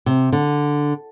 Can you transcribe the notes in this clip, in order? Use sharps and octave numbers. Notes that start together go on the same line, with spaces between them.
C3
D3